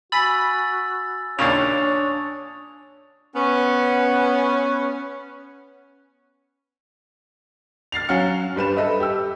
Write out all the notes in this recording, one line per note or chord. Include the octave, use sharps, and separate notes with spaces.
F#4 G#5 B5 E6 A6
D#2 A#2 C#3 D4 C#5 D#6 A6 F7
B3 C#4
F6 A6 C7 F7
F#3 C#4 F5 F#5 F6 C#7
G2 G3 B4 E7
A4 B4 D#5 E5
G4 E6